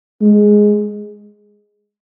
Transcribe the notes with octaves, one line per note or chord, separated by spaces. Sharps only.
G#3